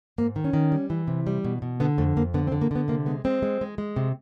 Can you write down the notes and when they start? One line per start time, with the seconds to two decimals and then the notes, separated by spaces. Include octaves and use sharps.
0.18 G#2 A#3
0.36 D#3
0.44 C#4
0.53 D#3
0.72 G3
0.90 E3
1.08 C3
1.27 G3
1.44 B2
1.62 B2
1.80 D3 B3
1.98 F2 A3
2.17 F2 A#3
2.34 D3 B3
2.47 C4
2.52 D3
2.62 A#3
2.71 D3 B3
2.88 C3 A#3
3.06 G#3 B3
3.25 G#3 C4
3.42 G#3
3.61 G#3
3.78 G#3
3.96 C3